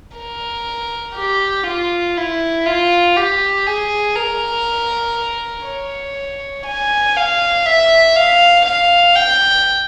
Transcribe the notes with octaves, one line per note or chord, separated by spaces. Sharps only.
A#4
G4
F4
E4
F4
G4
G#4
A#4
C#5
G#5
F5
E5
F5
F5
G5